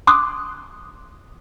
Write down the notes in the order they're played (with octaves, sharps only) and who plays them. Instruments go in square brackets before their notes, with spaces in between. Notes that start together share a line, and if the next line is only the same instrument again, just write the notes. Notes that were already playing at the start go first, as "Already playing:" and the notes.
[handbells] C6 D6 D#6 F#6